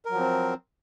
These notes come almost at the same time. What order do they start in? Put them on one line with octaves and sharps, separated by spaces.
A#4 F#3 F3 C4